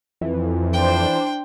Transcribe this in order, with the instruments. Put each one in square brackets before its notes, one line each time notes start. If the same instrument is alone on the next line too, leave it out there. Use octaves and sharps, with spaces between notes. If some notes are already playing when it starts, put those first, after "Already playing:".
[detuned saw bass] F2 [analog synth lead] E3
[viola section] D4 C5 [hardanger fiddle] G5